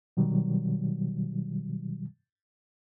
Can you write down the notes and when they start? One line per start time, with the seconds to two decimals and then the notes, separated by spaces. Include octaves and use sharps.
0.17 B2 D#3 F#3 G3